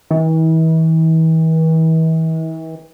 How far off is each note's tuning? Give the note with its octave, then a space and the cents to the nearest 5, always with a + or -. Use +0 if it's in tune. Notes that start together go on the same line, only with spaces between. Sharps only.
E3 -40